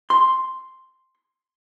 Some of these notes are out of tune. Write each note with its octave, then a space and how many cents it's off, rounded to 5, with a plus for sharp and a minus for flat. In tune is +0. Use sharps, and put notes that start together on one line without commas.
C6 +0